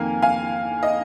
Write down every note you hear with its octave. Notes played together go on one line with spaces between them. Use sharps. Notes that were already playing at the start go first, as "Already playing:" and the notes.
Already playing: F2 D#3 A#3 F5 G#5
F5 G#5
D#5